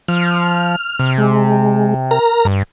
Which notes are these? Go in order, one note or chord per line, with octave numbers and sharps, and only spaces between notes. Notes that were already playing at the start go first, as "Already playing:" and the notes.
F3 F6
C3
G#3
A#4 A#5
G2